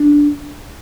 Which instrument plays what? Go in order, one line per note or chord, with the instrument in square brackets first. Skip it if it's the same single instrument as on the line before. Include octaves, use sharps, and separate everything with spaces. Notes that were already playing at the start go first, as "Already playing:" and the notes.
Already playing: [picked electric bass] D4